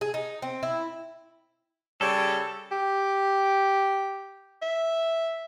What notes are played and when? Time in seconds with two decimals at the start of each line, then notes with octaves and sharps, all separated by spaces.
0.01 G#4
0.14 D#4
0.42 C4
0.63 E4
2.01 C#3 G3 A4 C#5
2.72 G4
4.62 E5